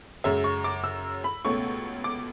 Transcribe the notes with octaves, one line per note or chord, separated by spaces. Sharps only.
F#2 C#3 G#3 C#4 E5
C#6
D6
E6
B5
C#2 B2 A3 C#4 C#6
D6